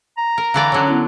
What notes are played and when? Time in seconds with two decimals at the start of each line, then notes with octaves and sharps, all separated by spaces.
0.17 A#5
0.38 A#4
0.54 D3 E3 D5 F5 B5
0.72 D3 F#3 C#4 C#5
0.88 B3 E4